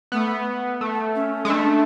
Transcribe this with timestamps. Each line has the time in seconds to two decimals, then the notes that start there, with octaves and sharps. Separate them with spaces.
0.12 A3 B3
0.81 A3
1.16 C#4
1.45 G#3
1.49 A3 D4